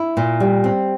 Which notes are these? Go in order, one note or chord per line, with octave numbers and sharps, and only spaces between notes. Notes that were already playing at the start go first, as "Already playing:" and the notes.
Already playing: E4
A#2
G3
C4